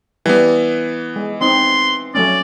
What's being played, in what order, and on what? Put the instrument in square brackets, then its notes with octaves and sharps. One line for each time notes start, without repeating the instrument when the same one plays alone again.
[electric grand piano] E3 B3 [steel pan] G3
[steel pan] G#3
[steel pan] C4 D#4 [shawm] C6
[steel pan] F#3 A3 C#4 [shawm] D5